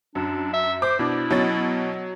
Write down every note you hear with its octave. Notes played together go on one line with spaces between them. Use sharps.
F#2 D4
E5
C5 D6
B2 D4 E4
B2 F#3 C#4 A6